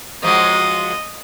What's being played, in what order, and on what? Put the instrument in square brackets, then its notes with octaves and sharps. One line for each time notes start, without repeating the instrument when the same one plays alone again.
[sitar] F3 F#3 G#3 [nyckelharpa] D#5